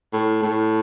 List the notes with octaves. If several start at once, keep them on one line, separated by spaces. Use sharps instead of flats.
A2
A2